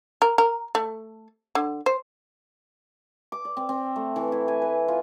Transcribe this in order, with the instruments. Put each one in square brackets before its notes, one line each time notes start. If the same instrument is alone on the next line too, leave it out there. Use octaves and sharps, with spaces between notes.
[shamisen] A#4
A#4
A3
D3
C5
[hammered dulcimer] D6
D5
C4
C4
A3
E3
E4
G#5
B4
F4